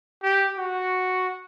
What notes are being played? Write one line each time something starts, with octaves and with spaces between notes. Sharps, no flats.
G4
F#4